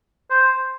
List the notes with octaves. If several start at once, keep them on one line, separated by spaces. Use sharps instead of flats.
C5